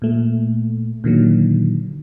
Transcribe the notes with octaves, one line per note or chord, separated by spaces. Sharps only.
A#2 A3
A#2 D3 D#3 F#3